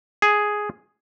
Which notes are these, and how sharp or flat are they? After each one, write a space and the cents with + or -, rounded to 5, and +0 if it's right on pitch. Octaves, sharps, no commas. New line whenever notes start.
G#4 +5